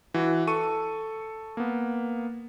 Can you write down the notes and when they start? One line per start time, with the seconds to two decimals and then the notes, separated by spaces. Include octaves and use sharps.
0.14 E3 F#4
0.47 A4 C#6 D#7
1.57 A#3 B3